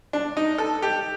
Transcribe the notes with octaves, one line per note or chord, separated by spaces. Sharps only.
D4
D#4
A4
G4